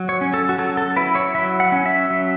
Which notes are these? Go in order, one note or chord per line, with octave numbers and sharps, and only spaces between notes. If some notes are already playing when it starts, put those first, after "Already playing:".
Already playing: F#3
C#5
C#4
A4
F#4
F#3 A4
A4
E4 B4
C#5
F#3 E5
F#5
C#4
E5
F#3